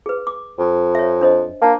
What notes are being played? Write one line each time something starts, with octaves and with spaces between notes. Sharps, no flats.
G#4 B4
D6
F2
C#5 E5
D4 C5 D#5
A#3 D4 A5